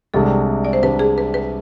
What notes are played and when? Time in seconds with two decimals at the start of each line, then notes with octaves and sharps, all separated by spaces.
0.14 C2 C3 G#3 D4 A4
0.65 D5
0.73 C5
0.82 C2 C3 G#3 D4 B4
0.99 G#4
1.18 B4
1.34 B4